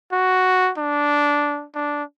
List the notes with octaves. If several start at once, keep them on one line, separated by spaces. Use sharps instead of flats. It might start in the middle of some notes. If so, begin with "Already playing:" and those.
F#4
D4
D4